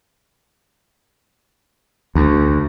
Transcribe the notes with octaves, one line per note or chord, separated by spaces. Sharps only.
D2